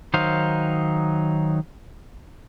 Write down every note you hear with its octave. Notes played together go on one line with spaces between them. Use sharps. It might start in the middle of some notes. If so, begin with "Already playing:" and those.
D#3 F#3 D#4 C5 F5